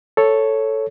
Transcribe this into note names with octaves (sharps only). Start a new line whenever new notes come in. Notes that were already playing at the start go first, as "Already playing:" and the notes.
A4 C#5